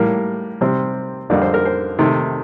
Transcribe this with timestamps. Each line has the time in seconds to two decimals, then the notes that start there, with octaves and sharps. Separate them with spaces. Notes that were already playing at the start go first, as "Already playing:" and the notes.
Already playing: A2 G3 A#3 A#4
0.61 C3 G3 C4
1.30 F2 D3 G3 A#3 D5
1.42 C5
1.54 A#4
1.65 C5
1.99 C3 D#3 A3